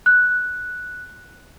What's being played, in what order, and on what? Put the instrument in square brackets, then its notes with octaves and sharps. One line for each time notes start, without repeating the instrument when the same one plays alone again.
[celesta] F#6